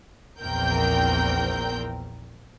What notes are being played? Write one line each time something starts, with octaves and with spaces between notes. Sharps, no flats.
A#1 E2 C4 A#4 G5 G6